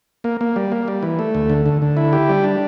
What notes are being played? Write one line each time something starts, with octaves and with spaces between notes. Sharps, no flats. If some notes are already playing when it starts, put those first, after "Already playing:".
A#3
A#3
G3
A#3
G3
E3
A3
D2
D3
D3
D3
E4
G4
G3
D4